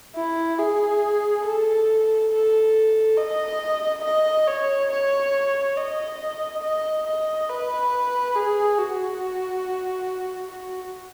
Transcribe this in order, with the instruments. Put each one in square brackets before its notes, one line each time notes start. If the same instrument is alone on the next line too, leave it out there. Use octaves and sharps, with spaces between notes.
[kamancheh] E4
G#4
A4
A4
D#5
D#5
C#5
C#5
D#5
D#5
D#5
B4
G#4
F#4
F#4